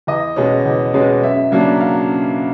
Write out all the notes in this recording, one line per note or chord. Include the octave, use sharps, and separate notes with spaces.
E2 D#5
B2 G#3 C#4
E2
B2 G#3 C#4
F#2 E5
C#3 F#3 A#3 D4
F5